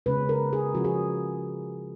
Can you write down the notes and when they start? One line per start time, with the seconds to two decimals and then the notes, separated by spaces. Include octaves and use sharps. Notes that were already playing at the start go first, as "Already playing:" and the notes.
0.06 C#3 G#3 C#4 B4
0.29 A#4
0.53 G#4
0.75 F3 G#3 C#4 F4 F#4
0.85 G#4